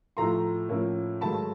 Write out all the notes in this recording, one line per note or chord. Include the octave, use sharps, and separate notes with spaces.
A2 F3 A3 A#5 C6
A2 F3 A#3 C#4
G#2 D#3 F#3 A3 A5 B5